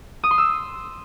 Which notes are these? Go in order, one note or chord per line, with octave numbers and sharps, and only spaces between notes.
D#6
C6
E6